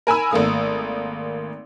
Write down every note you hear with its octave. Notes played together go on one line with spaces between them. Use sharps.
A#4 G#5 B5 E6
G#1 A3 A#3 D#6